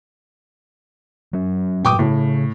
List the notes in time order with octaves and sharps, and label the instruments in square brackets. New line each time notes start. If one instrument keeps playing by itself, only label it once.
[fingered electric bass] F#3 C#4
[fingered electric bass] G2 A#2 F#3 [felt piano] G5 D6 D#6
[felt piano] A2 [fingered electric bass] C#3